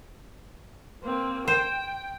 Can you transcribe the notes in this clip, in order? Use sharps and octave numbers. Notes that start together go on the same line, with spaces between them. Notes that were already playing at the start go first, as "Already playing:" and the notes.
A#3 C4
C5 G5